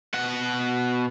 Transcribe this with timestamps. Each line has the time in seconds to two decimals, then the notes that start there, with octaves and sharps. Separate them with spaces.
0.14 B2 F#5